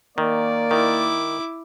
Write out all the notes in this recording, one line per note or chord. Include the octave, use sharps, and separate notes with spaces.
D#3 A#3 D5
D#3 E4 D6